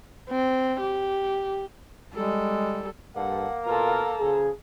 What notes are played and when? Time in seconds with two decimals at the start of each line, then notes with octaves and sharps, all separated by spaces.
0.30 C4
0.80 G4
2.14 G3 G#3 A4
3.16 G2 G3 A#3 A4 F#5
3.65 B2 F4 A4 A#4 A#5
4.20 C#3 F3 G#4